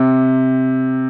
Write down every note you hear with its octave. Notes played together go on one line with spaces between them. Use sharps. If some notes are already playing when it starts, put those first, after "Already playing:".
Already playing: C3